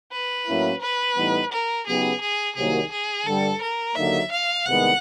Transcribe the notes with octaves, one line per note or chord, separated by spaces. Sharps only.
B4
A2 F#3 A#3 C#4 E4
B4
A2 E3 G3 B3 D#4
A#4
C#3 F#3 B3 D#4 G4 G#4
G#4
C2 C3 D#3 F#3 A#3 G#4
G#4
G2 D3 G3 A4
A#4
D#2 D3 F#3 A#3 D#4 E5
F5
C2 C3 D#3 G#3 B3 F#5